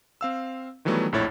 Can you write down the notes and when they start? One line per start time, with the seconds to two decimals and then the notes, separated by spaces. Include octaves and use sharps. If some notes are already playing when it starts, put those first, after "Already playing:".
0.21 C4 F5 E6
0.85 D#3 E3 F#3 G3 A3 B3
1.12 A#1 F2 A2 E4 C#5 A6